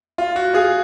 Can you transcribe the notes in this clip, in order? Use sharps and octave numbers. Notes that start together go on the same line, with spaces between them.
F4
F#4
F4 G#4